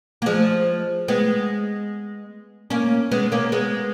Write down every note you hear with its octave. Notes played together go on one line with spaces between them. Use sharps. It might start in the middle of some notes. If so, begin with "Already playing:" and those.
A#3
F3 G#3
G#3 B3
A#3 C#4
G#3 B3
A#3 C#4
G#3 B3